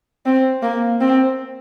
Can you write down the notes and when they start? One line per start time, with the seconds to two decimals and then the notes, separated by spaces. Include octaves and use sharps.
0.26 C4
0.63 A#3
1.01 C4